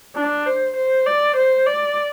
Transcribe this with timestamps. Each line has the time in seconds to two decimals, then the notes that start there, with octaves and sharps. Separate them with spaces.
0.16 D4
0.46 C5
0.77 C5
1.06 D5
1.37 C5
1.67 D5